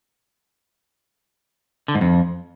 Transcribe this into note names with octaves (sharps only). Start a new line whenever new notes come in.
D3
G#2
F2